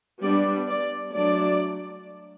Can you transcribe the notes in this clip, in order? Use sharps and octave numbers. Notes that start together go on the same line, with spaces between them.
G3 B3 D4 D5
D5
F#3 A3 D4 D5